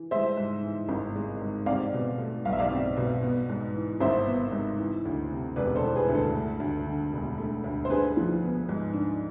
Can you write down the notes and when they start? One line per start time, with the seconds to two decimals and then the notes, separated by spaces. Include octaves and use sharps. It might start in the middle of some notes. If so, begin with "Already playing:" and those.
Already playing: E3
0.11 G#3 C5 E5
0.37 G#2
0.63 E3
0.89 G#1
1.16 G#3
1.41 G#2
1.66 C4 D5 F5
1.93 B2
2.18 A3
2.45 B1 F5
2.53 E5
2.59 D5 F5
2.71 C4
2.97 B2
3.23 B3
3.49 G#2
3.74 E3
4.00 G#1 C5 E5
4.27 B3
4.52 G#2
4.78 E3
5.05 D2
5.31 C3
5.56 E1 B4 D5
5.75 A4 C5
5.83 E3
5.95 G#4 B4
6.08 D2 B4
6.15 A4
6.35 A3
6.60 D2
6.86 D3
7.13 E1
7.38 A3
7.64 D2
7.85 C5
7.90 D4 G#4 B4
8.17 F3
8.43 B3
8.69 G#2
8.94 D4